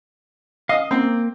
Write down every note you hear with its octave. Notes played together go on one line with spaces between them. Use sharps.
D#5 F5 D#6
A#3 C4